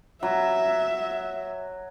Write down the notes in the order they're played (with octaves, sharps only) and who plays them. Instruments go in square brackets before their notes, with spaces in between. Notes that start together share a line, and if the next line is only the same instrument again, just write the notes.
[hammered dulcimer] F#3 [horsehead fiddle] E5